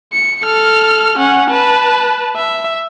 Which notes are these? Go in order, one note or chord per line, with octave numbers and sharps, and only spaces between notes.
C#7
A4 F6
C#4 F#5
B4 A5
E5